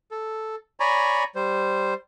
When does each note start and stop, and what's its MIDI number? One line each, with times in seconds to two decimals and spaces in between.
0.11 0.56 69
0.80 1.24 73
0.80 1.24 74
0.80 1.24 80
0.80 1.24 82
0.80 1.24 83
0.80 1.24 85
1.35 1.94 55
1.35 1.94 72